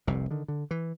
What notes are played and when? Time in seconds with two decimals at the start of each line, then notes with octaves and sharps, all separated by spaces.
0.07 F1 C2 C3
0.31 D3 D#3
0.48 D3
0.71 E3